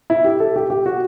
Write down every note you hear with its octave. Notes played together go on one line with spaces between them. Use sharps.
E4
G4
A4
G4
G4
F#4